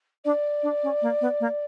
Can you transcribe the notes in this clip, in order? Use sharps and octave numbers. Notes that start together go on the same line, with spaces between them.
D4 D5
D4
C#4
A#3
B3
A#3